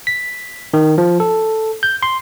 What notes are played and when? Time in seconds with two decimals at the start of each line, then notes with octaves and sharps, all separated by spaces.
0.07 B6
0.74 D#3
0.98 F3
1.20 A4
1.83 G6
2.03 C6